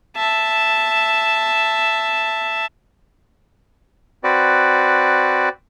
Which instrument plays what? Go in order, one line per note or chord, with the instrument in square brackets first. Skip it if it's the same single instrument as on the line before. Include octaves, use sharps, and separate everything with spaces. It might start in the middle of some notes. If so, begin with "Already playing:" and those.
[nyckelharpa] E5 A5
[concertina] C4 F#4 B4 D5